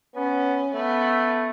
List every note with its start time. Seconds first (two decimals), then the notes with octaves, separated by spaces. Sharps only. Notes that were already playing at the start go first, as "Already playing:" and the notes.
0.15 B3 C#4
0.74 A3 B3